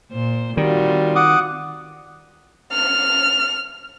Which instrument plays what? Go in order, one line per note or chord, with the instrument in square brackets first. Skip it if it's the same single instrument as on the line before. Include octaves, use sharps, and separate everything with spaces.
[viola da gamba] A#2 C5
[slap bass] D#3 [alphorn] G3 [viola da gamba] C4 F4 F#4
[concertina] F#5 D6 D#6
[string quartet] F6